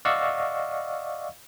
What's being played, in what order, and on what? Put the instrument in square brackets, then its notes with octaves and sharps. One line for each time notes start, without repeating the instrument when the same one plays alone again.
[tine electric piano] D5 D#5 F5 F#5 C#6 E6